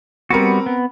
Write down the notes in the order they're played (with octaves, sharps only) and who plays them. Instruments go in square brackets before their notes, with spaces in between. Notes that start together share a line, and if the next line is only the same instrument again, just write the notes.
[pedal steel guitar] G3 B3 F#4 [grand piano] C4 A#4
[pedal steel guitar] B3